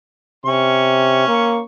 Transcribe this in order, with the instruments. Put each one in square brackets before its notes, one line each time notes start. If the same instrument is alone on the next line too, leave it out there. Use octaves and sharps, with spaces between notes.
[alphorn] C3 [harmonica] C#4 C#6
[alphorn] A#3